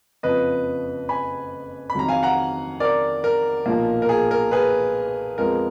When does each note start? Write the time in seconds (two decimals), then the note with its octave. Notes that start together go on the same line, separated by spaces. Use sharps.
0.23 F#1 F2 F3 B4 D#5
1.09 G#5 B5
1.90 B5
1.95 F2 D#3 F#3 A#5
2.08 F5 G#5
2.23 F#5 A#5
2.80 A#4 D5
3.24 A#4
3.66 B1 A#2 F3 A#3
4.02 A#4
4.09 G#4
4.31 A#4
4.51 G#4 B4
5.38 F2 F3 G#3 B3 A#4